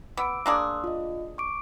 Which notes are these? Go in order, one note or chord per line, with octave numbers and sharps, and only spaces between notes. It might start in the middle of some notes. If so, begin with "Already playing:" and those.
B3 D6 E6 D7
A#3 D4 G#4 C6 E6 F#6
F4 D#5
C#6 D6 D7